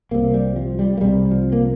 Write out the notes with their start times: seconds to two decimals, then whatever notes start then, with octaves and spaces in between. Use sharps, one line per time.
0.11 C2 C3 A#3
0.34 G3
0.56 F3
0.79 G3
0.97 A#3
1.01 C2 C3 G3
1.31 F3
1.52 A#3